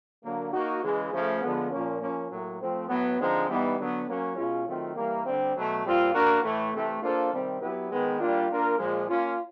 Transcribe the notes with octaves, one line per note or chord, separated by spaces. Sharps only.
D3 F#3 A#3
A#3 D#4 F#4
C#3 E3 G#3
C#3 F3 A3
D3 F3 G#3 B3
A#2 F3 A#3 C#4
F3 A#3 C#4
A2 F#3 A#3
F3 A3 C4
A2 F#3 B3
D3 F3 G#3 C4 D#4
E3 G3 B3 D#4
D3 F#3 B3
F#3 A#3 C#4
B2 G#3 C#4 F4
D#3 F#3 A3 C4 F4
E3 G3 A#3
D3 G3 C4
B2 F#3 A3
A#2 G3 C4 F4
A#3 D4 F#4 A#4
A2 E3 A3
C3 E3 A3
A#3 D4 F4 A4 C5
C3 D#3 G3 C4
F#3 B3 E4 G4 B4
D#3 G#3 B3
G3 A#3 D4 F4
A#3 D4 F4 A#4
A#2 F3 G#3
A#3 C#4 F4